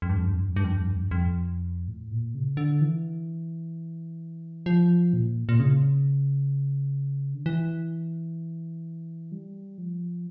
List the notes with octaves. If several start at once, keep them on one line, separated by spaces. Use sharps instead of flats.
F2
G2
F2
G2
F2
G2
F2
G2
F2
G2
F2
G2
F2
G2
F2
A2
A#2
C#3
D3
E3
F3
A#2
A#2
C#3
D3
E3
G3
F3